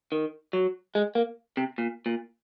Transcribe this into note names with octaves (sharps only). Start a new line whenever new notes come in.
D#3
F#3
G#3
A#3
C3
A#2
A#2